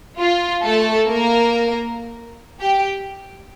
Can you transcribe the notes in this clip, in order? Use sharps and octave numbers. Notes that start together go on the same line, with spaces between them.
F4
A3 A4
A#3 A#4
G4 G5